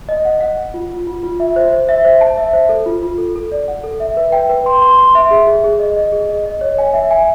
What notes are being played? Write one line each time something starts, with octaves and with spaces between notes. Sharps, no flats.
D#5
F#5
F#5
F#5
F4
F4
F4
F4
E5
C5
C5
E5
C5
A5
E5
C5
A4
F4
F4
A4
A4
D5
F#5
A4
E5
B4
G5
B4
C6
C6
C6
E5
G#4
G#4
G#4
D#5
D#5
G#4
D#5
D#5
C#5
G#5
E5
G#5